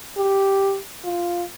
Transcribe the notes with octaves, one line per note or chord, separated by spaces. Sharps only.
G4
F4